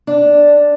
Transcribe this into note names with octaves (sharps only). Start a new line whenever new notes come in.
D4